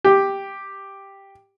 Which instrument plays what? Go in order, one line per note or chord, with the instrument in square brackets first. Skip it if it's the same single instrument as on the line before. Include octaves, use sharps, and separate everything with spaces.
[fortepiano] G4